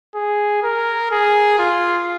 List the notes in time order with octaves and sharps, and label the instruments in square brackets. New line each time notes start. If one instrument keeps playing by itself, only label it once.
[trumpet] G#4
A#4
G#4
F4